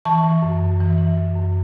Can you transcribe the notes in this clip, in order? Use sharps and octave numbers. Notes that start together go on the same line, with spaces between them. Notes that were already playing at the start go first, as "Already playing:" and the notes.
E3 A5 C#6
E3
F#2
F#2
E3
E3
F#2
F#2